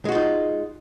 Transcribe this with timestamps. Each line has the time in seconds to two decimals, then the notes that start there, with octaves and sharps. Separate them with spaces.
0.05 G#3
0.09 F#4
0.12 F4
0.15 D#4